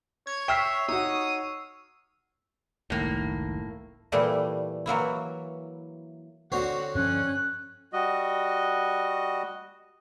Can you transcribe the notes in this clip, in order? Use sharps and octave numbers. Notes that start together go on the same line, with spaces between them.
C#5 G#6
E5 G5 C#6 E6 F6 B6 C7
D#4 F#4 C#5 D#6
F#1 C#2 A2 D#3 A#3
A#2 E3 G3 A3
E3 F#3 A#3 E4
D3 C4 F#4 C#5
G2 F3 C#4 F#6
G3 F#4 D#5